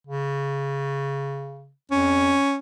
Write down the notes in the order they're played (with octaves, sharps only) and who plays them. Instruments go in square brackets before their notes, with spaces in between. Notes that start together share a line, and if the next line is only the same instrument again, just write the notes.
[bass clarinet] C#3
[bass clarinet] F2 [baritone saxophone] C#4